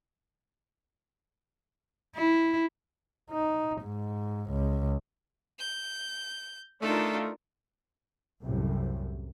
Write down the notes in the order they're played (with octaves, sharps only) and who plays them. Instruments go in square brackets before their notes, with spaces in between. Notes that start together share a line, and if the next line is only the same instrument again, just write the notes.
[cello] E4
[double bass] D#4
G#2
C#2
[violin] G6
[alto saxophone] A3 [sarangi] D4 [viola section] D#4 F4 A#4 [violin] A4
[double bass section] C2 F#2 A2 C3